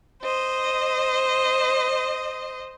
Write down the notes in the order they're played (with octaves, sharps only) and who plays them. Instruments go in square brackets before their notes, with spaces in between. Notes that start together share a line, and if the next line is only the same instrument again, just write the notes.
[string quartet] C5 D#5